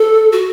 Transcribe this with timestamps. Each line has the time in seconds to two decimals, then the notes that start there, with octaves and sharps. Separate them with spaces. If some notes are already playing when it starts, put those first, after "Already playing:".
Already playing: A4
0.32 F#4